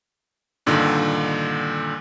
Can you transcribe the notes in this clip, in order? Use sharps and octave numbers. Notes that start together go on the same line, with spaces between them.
G2 A#2 D3 D#3